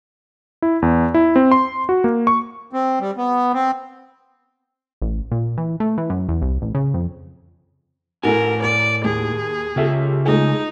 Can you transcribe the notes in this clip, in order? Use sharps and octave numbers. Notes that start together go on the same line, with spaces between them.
E4
E2
E4
C4
C6
F#4
A#3
C#6
C4
G3
B3
C4
A1
A#2
E3
A3
E3
F#2
E2
C2
A1
C#3
F2
A2 A3 E4 F#4 A#4 G#5
A#4 D5
D#2 G#4
C#3 F4 G4 A4 E5
C#2 A3 D#4 G#4